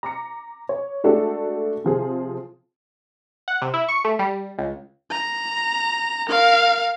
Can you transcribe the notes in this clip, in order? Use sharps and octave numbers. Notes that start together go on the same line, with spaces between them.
A#5 D6 C#7
C#5
G#3 A3 D4 F#4 G#4 A4
C3 F3 G#4
F#5
C3
E4
C#6
A3
G3
C#2
A#5
A#4 F5